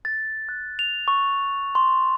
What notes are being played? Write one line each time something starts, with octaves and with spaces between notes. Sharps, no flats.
A6
F#6
F7
C#6
C6